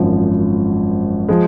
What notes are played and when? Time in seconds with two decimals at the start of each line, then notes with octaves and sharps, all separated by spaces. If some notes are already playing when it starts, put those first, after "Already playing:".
Already playing: G#1 F#2 F3
1.29 F3 G#3